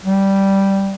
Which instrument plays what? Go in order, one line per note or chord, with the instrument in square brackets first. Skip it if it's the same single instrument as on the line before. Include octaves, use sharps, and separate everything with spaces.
[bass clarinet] G3